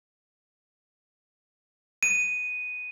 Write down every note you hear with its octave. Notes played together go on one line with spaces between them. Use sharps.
D#7